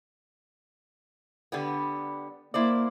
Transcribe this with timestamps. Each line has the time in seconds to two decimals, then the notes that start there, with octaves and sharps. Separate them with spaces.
1.52 D3 G3 B3
2.54 A#3 E4 C5 D5